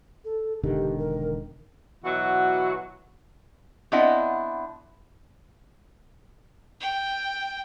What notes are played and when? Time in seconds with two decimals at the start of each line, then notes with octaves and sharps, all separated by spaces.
0.25 A4
0.63 E1 D3 D#3 G4
0.99 A#4
2.05 B2 E3 F#3 F#4
3.92 B3 C4 D4 E4 D#5 F#5
6.80 G5